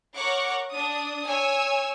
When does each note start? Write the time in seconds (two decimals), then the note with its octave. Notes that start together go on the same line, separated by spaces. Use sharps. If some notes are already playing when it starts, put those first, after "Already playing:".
0.14 A#4 C#5 F#5 C#6 D6
0.69 D4 D#6
1.27 C#5 G#5 E6